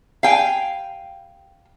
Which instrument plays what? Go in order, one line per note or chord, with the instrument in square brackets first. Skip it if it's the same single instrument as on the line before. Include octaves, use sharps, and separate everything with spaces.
[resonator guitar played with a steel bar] F5 G5 G#5